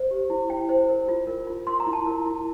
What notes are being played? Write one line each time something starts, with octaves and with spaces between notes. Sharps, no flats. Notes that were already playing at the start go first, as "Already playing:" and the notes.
Already playing: C5
G4
E4
E4 G5
C5
A#4
F4
A#4
F4
A#4 C6
A#5
E4
A5
A#4
E4